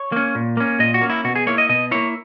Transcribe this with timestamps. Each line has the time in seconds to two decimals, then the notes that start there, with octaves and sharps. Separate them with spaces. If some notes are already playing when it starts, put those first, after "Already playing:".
Already playing: C#5
0.12 A#3 C#4
0.35 A#2
0.57 A#3 C#4
0.79 A#2 D#5
0.94 F#4
1.01 A#3 C#4
1.10 E4
1.24 B2 F#4
1.35 G#4
1.47 A#3 E4 C#5
1.58 D#5
1.69 B2 D#5
1.91 A#3 E4 C#5